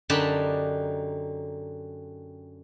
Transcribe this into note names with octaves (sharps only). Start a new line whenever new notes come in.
F#2 D3 D#4 G4 A5 B5